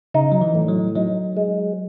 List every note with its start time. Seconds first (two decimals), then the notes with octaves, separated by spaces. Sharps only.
0.14 C#3 D#4
0.32 F#3
0.41 E3
0.55 A2
0.68 F#3
0.95 F#3 D#4
1.37 G#3